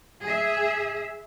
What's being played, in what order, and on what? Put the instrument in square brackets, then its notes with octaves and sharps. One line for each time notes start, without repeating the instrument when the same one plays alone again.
[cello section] G#4 E5